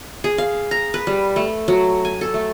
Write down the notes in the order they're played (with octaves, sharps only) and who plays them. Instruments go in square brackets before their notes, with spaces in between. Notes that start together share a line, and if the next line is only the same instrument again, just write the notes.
[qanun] G#4
F5
A#5
B4
G3
A3
F#3
G#5
A4
A3